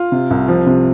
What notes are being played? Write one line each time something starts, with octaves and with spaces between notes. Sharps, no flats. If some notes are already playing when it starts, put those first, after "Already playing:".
Already playing: F4
C3
C2
F3
C3